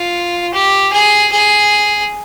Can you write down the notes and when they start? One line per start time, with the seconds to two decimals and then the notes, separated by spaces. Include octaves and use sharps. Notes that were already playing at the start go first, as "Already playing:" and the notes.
Already playing: F4
0.54 G4
0.93 G#4
1.32 G#4